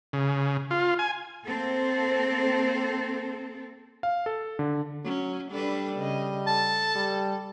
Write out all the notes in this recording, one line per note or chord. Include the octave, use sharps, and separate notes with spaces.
C#3
F4
G#5
A#3 C4 A4
F5
A4
D3
F#3 C#4
G3 D4 A4 B4
C#3 D#5
A4 A5
G3